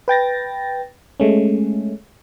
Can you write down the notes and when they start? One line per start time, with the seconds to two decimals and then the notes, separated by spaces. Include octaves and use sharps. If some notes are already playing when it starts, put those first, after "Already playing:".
0.08 B4 G5 A6 A#6
1.20 G#3 A3 C#4